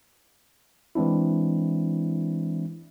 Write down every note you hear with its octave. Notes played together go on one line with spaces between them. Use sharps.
E3 G#3 C4 D4 E4